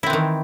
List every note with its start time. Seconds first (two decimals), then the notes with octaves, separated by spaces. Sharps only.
0.03 E4
0.06 C4
0.10 E3
0.13 D#3